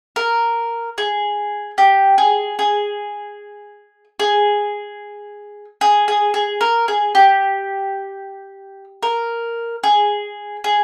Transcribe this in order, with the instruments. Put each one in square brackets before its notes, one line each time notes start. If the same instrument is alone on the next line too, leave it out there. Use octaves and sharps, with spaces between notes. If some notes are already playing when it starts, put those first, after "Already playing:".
[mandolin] A#4
G#4
G4
G#4
G#4
G#4
G#4
G#4
G#4
A#4
G#4
G4
A#4
G#4
G#4